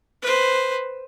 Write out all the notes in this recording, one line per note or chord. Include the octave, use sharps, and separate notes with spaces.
B4 C5